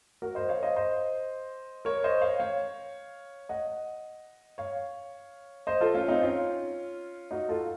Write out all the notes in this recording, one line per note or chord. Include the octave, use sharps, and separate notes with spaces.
F#4 A#4
C5 D#5
C#5 F5
C5 D#5
C5 D#5
A#4 C#5
C5 D#5
C#5 F5
C#5 F5
D#5 F#5
C#5 F5
C5 D#5
F4 A4
C#4 F4
C4 D#4
C#4 F4
D#4 F#4
F4 A4